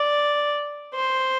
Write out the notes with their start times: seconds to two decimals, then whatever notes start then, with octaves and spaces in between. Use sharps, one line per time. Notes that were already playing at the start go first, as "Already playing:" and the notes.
Already playing: D5
0.95 C5